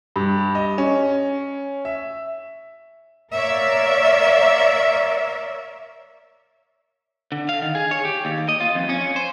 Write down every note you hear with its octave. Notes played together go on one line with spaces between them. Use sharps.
G2
D#5
C#4
E5
A#4 C#5 D5 E5 F5
D3
F5
D#3
G#4
C#5
G4
D#2
D#5
F4
F2
C#4
C5